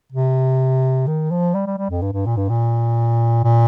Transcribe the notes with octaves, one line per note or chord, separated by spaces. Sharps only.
C3
D#3
F3
G3
G3
G3
F2
G2
G2
A#2
G2
A#2
A#2